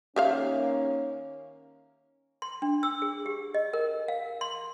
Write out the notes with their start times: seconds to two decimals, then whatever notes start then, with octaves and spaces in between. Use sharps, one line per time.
0.16 D#3 A#3 C#4 G4 E5 F5
2.42 C6
2.62 D4
2.83 E6
3.02 G#4
3.26 G4
3.54 D#5
3.73 A#4
4.08 F5
4.41 C6